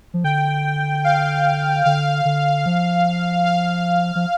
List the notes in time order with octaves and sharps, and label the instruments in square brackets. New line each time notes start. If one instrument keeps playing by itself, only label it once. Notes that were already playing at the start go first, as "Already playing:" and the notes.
[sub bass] F3
[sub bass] D3 [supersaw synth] G5
[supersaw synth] F5
[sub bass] D3 [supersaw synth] F5
[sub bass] D3
F3
[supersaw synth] F5
[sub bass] F3